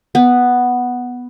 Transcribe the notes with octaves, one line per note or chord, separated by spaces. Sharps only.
B3